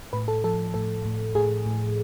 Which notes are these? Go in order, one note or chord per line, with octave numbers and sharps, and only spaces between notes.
A2 B4
A4
F3 A4
A2 A4
A2
A2 G#4
A2